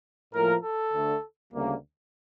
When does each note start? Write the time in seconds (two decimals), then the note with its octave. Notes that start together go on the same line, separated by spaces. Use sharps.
0.34 A2 F3 A#3 A#4
0.63 A4
0.93 D2 D3 A3
1.54 D2 C#3 G3 A#3